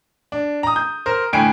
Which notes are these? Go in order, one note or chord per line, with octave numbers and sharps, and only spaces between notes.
D4
A#5 D#6
G6
A#4 C5
G1 A2 G5 G#5 D7